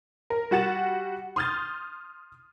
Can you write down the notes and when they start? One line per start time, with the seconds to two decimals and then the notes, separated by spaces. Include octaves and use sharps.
0.30 A#4
0.51 G3 F#4 F#5 A6 E7
1.36 C6 D#6 F6 G6 A6